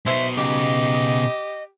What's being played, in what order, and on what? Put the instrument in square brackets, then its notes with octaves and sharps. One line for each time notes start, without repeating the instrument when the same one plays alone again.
[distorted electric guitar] B2 D#4 [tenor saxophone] C5 [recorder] E5
[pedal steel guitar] C#3 [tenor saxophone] G4 [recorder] D#5